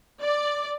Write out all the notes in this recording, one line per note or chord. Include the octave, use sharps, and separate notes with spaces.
D5